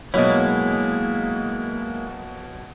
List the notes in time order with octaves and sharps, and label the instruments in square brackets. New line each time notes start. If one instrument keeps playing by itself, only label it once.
[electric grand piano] B2 F#3 [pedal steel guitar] G#3 A#3 E4 [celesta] C#5 D#5